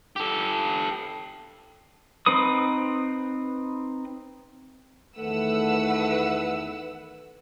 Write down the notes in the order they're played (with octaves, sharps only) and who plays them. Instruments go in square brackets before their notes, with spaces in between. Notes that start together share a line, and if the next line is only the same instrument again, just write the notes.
[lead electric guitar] G4 A4
[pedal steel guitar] C4 D#4 B4 D#6
[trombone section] E2 D#3 A3 [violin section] B4 F#5 E6